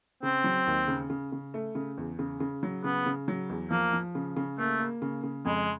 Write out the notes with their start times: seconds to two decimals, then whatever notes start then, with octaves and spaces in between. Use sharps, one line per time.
0.23 C#3 C4
0.44 F#3
0.67 D#2
0.88 C#3
1.10 C#3
1.32 C#3
1.54 A3
1.75 C#3
1.98 E2
2.19 C#3
2.40 C#3
2.63 F#3
2.84 C#3 B3
3.06 C#3
3.28 F#3
3.50 E2
3.71 F3 A#3
3.93 F3
4.15 C#3
4.36 C#3
4.58 A3 A#3
4.80 A#3
5.02 C#3
5.23 C#3
5.45 F2 G#3